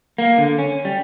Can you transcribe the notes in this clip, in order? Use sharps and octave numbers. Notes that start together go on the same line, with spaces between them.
A#3
D3
C#4
G3